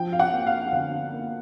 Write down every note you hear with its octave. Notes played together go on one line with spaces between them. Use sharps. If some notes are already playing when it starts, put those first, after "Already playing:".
Already playing: F3 G5
F5
F#5
A#3
F5
D3 F5
A#3